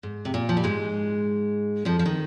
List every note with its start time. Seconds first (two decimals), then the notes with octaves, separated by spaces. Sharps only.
0.03 G#2
0.25 C3
0.34 A#2
0.49 F3
0.57 G3
0.64 G#2 G#3
1.85 F2 F3
1.99 F3
2.05 D#3